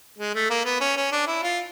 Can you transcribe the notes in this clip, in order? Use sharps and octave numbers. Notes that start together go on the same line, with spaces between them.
G#3
A3
A#3
B3
C#4
C#4
D4
E4
F4